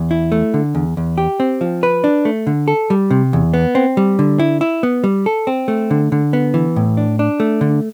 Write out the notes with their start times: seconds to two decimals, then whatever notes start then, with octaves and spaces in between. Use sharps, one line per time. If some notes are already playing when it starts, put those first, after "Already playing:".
Already playing: E2
0.11 E4
0.32 A3
0.54 D3
0.75 E2
0.97 E2
1.18 G4
1.40 C4
1.61 F3
1.83 B4
2.04 D4
2.25 A3
2.47 D3
2.68 A4
2.90 G3
3.10 C3
3.33 E2
3.54 B3
3.75 C4
3.97 G3
4.19 D3
4.40 E4
4.61 E4
4.83 B3
5.04 G3
5.26 A4
5.47 C4
5.68 A3
5.91 D3
6.12 D3
6.33 B3
6.54 E3
6.76 A2
6.97 D4
7.19 D4
7.40 A3
7.61 D3